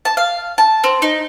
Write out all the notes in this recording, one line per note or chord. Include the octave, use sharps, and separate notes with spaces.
A5
F5
A5
C4
D#4